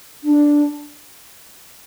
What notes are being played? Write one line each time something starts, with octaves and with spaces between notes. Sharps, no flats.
D4